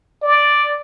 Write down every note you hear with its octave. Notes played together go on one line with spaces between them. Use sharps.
D5